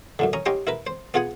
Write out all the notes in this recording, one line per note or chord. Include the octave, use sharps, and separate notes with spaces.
F#2 A2 D3
C#4 A#5 D#6
C#4 D#4 G4 D#5 G5 C6
E4 A#4 B4
C5
B3 F4 G#4 F#5 G#5